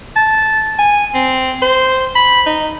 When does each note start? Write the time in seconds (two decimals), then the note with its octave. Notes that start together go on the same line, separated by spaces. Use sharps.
0.16 A5
0.78 G#5
1.14 C4
1.62 C5
2.15 B5
2.46 D#4